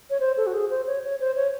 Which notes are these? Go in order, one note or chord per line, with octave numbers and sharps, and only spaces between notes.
C#5
C5
A4
F#4
G#4
C5
C#5
C#5
C5
C#5